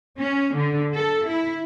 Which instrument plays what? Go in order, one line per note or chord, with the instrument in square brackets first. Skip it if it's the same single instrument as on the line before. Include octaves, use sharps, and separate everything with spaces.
[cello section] C#4
D3
A4
E4